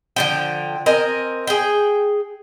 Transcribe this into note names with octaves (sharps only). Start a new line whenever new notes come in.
D3 F3 G5
C4 A#4 D#5 G#5
G#4 G5